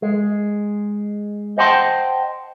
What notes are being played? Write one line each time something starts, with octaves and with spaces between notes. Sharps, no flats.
G#3
C5 D#5 F#5 G5 A5 C6